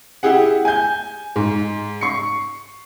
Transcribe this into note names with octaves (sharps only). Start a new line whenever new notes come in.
E4 G4 G#4 F#5
G#5 G6
G#2
C#6 C7 C#7